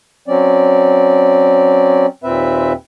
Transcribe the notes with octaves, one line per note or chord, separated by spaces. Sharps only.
F#3 C4 C#4 D5
D#2 A#2 C4 B4 E5